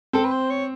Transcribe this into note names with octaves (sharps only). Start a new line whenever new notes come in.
C4 A4
B4
C5
C#5